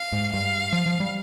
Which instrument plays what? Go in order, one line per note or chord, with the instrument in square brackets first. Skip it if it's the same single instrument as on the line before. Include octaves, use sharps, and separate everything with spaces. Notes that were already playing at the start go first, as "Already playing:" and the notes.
Already playing: [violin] F5
[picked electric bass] G#2
[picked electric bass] G2 [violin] F5
[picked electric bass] F3
F3
G3